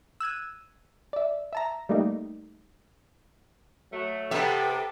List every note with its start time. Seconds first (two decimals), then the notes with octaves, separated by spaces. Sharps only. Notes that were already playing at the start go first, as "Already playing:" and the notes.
0.20 E6 F#6 G#6 D#7
1.13 D5 E5
1.53 E5 A5 A#5
1.89 G3 A3 A#3 D#4 G4
3.92 F#3 A3
4.31 C3 B3 A4 E5 G5